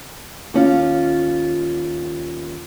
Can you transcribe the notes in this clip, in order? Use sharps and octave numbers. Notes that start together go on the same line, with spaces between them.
D#2 C#4 F4